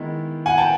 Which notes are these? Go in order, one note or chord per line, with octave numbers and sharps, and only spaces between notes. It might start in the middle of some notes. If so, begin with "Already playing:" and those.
Already playing: D#3 G#3 B3 E4
F#5 G#5
G5 A5